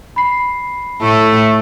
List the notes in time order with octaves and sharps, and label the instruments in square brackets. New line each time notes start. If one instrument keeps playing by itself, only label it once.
[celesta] B5 C7
[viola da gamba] A2 E4 A4 [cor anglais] A3